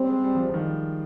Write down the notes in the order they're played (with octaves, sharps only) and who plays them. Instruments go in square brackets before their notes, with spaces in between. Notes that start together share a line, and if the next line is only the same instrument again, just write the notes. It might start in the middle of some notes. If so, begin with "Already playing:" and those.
Already playing: [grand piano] G3 [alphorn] C4
[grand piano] G#3
G3
F3
G3
F3
D#3